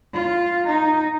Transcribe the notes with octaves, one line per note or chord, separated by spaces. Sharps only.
F4
D#4